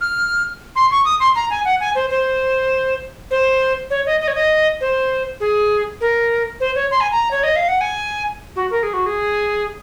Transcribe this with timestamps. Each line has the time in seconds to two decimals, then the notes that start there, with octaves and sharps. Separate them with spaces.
0.01 F6
0.76 C6
0.91 C#6
1.05 D#6
1.20 C6
1.35 A#5
1.50 G#5
1.65 F#5
1.80 G#5
1.95 C5
2.10 C5
3.31 C5
3.90 C#5
4.06 D#5
4.21 D#5
4.28 C#5
4.35 D#5
4.81 C5
5.40 G#4
6.01 A#4
6.60 C5
6.75 C#5
6.91 C6
7.01 G#5
7.11 A#5
7.31 C#5
7.43 D#5
7.56 F5
7.68 F#5
7.81 G#5
8.56 F#4
8.71 A#4
8.83 G#4
8.94 F#4
9.06 G#4